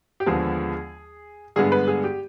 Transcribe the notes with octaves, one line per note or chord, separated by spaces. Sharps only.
G4
D#2 D3 F3 G#3 B3 G#4
G2 D3 G#3 B3 G#4
B4
G#4
G4